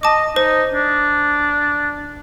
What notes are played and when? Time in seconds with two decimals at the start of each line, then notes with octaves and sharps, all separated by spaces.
0.03 D#5 A5 D6
0.36 D#4 C5
0.73 D4